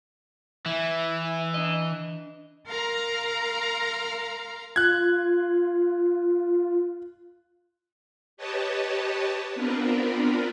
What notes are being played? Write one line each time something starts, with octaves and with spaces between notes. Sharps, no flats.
E3 E4
D4 D#5
A#4 F5 A#5 C6
F4 F#6 G#6
G4 B4 C#5 D#5 A5
B3 C4 D4 F4 A#4 B4